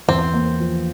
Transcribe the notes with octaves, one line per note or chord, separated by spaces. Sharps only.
E2 C4
A#3
F3